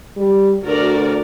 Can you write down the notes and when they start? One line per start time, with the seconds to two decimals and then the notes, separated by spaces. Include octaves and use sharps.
0.17 G3
0.64 D2 F#4 A#4 D5